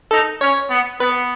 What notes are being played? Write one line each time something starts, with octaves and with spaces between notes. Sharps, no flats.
D#4 A4
C#4 C#5
B3
B3 B4